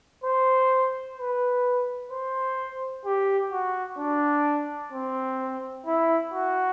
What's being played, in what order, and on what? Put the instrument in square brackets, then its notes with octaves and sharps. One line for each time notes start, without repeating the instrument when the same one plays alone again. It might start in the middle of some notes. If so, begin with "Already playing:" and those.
[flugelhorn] C5
B4
C5
G4
F#4
D4
C4
E4
F#4